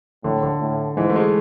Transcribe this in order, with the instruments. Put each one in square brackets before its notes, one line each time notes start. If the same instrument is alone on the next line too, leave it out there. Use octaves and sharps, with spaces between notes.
[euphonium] A2 [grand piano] D3
[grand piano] D3
[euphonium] A2
[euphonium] G#2 [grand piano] E3
[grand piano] A3
G#3